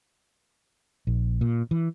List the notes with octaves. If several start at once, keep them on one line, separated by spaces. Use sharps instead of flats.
A#1
A#2
E3